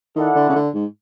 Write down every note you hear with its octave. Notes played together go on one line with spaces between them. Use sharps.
D#3 E4 A4 D5 F#5
D3
C#3
D3
G#2